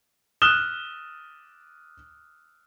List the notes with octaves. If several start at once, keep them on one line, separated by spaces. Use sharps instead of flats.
D#6 F6 F#6 E7 G7